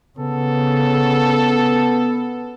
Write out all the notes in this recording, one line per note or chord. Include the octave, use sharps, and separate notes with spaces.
C#3 B3 A4